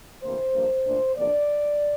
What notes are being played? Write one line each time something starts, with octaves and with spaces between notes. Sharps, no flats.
D2 C3 E3 A#3 C5
G2 F3 A#3
A#2 A3 D4
E2 C3 F3 A#3 D4 D5